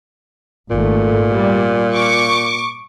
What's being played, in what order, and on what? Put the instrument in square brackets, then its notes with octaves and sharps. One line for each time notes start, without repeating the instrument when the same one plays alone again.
[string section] G#1 A3 [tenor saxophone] A#2
[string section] G3
C#6 D6